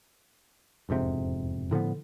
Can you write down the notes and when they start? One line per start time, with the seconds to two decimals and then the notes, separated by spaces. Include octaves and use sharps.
0.89 E1 F2 G#2 C3
1.71 A2 D3 F3 B3